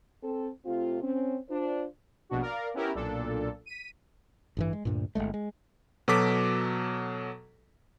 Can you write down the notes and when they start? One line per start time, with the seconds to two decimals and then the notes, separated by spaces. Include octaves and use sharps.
0.23 C4 A4
0.65 C3 A3 C4 F4
1.03 C4 C#4
1.49 D4 F4 C5
2.29 A#1 B2 D4 F#4
2.42 A#4 D5 F5
2.74 B3 C#4 E4 G4 A#4
2.95 B1 A#2 D4 A4
3.66 B6 D#7
4.57 A1 G2 E3
4.73 G#3
4.85 D2 G2 A#2
5.15 G1 F#2 G#3 A3
5.34 G#3
6.08 B2 F#3 A4 D6 B6